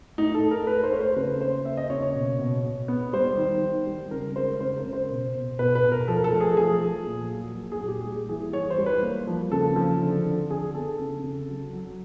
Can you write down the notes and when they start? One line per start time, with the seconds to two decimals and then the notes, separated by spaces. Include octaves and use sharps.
0.18 A2 D#4
0.34 A4
0.43 A3
0.51 A#4
0.67 A3 B4
0.84 C5
0.92 A3 C#5
1.00 C5
1.16 C#3 B4
1.41 A#3 C5
1.65 A#3 E5
1.77 D#5
1.90 C#3 C#5
2.02 C#5
2.15 B2
2.39 B2
2.64 B2
2.88 B3
3.13 G3 C5
3.37 D#3
3.62 D#3
3.87 G3
4.11 C#3 A#4
4.36 G#3 C5
4.60 C#3 C5
4.77 A#4
4.85 C#3
4.93 C5
5.10 B2
5.34 B2
5.59 B2 B4
5.75 B4
5.83 B2
5.92 A#4
6.08 F3 A4
6.17 A#4
6.24 A4
6.32 A3
6.41 G#4
6.57 F3 G#4
6.82 F3
7.06 A#2
7.31 F#3
7.55 F#3
7.72 G#4
7.80 A#2
7.88 G4
8.04 G3 G#4
8.29 E3 G#4
8.53 E3 C#5
8.70 C5
8.78 G3
8.86 B4
9.03 A#3
9.27 F3
9.52 C#3 A4
9.76 F3
10.01 D3
10.26 D3
10.50 D3 G#4
10.75 B3 A4
10.99 C#3
11.24 C#3
11.48 F#3
11.73 F#3